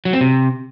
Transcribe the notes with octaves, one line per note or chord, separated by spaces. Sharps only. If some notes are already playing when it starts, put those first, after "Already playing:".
F#3
C4
C3